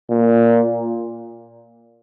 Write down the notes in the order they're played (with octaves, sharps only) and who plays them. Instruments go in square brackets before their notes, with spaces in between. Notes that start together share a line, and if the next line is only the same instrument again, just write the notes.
[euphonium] A#2